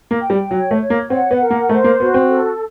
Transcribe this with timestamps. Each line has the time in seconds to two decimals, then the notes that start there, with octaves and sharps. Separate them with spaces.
0.11 A#3
0.21 G5
0.30 G3
0.51 F#3 C#5
0.71 A3
0.81 C#5
0.90 A#3
1.10 C4 F#5
1.31 B3
1.40 A#4
1.50 A#3
1.69 A3 C5
1.84 A#3
2.00 B3 F#4
2.14 C4
2.30 A4